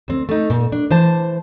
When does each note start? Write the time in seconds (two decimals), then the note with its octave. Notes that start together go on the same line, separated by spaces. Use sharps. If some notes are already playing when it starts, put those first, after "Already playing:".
0.08 D2 C4
0.29 A3 D#4
0.50 A#2
0.72 D4
0.91 E3 C5 A5